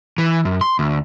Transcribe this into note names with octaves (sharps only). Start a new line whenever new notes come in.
E3
F#2
C6
D2